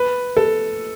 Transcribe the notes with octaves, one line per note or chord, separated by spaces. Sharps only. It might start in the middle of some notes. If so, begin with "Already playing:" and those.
Already playing: B4
A4